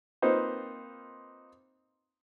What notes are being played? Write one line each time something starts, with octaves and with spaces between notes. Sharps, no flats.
A#3 C4 D#4 F4 B4 C5